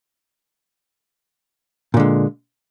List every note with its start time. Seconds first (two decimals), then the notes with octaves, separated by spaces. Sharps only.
1.94 A#2
1.97 D3
2.00 G#3